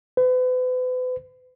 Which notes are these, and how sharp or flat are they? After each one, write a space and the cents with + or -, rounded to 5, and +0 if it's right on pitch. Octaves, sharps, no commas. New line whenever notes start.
B4 +40